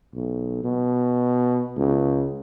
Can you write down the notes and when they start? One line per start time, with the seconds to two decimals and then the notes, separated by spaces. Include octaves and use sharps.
0.14 B1
0.64 B2
1.77 C#2